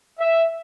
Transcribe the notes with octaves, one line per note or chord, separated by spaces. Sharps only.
E5